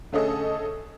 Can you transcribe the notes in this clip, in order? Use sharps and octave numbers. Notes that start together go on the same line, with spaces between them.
D3 A3 C#4 G#4 A4 D#5